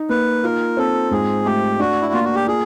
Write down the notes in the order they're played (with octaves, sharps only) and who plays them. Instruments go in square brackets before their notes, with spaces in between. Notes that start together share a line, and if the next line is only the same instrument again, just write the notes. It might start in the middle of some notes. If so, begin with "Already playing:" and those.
Already playing: [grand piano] D#4
[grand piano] A#3 [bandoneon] B4
[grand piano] F4 [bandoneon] A#4
[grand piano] C4 [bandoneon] A4
[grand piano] G#2 [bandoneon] G#4
[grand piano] A3 [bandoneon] G4
[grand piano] D4 [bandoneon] F#4
[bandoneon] E4
[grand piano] A#3 [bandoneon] F4
[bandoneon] F#4
G4
[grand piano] F4 [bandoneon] G#4